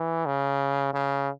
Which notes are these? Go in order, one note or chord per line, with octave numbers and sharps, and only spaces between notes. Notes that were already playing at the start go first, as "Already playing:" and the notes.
Already playing: E3
C#3
C#3